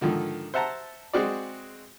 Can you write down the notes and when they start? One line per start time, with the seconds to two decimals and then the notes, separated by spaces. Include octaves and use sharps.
0.01 G#2 D3 D#3 F3
0.54 C5 E5 F#5 A5 A#5
1.13 G#3 C4 F#4 G#4 D5